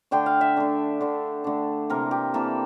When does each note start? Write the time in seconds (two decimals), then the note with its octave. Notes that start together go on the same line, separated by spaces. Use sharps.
0.11 D3 A3 D4 G5
0.26 F5
0.41 E5
0.57 D3 A3 D4
1.01 D3 A3 D4
1.44 D3 A3 D4
1.90 C3 E3 A#3 A#4
2.11 G4
2.34 C3 E3 A#3 A4